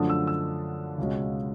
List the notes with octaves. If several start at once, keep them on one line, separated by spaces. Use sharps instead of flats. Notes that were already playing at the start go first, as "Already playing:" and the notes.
Already playing: F#2 D3 F3 A3 D4 D#6
E6
E6
C#2 B2 G#3 C#4